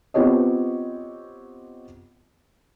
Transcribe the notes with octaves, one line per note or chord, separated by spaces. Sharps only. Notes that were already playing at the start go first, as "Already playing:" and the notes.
B3 C4 F4 G4 C#5 D#5